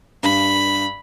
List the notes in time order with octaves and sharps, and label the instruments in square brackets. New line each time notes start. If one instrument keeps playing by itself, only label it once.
[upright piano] G2 [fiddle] B5